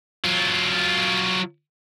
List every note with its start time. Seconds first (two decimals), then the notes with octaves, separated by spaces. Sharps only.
0.24 F#3 F4